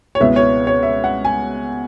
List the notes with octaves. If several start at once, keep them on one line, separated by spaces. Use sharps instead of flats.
C#5
C#2 B2 B3 E4 E5
C#5
C#5
E5
F#5
G#5